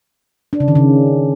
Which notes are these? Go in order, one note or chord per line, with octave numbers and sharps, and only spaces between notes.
D4
C#3
D#3
C#3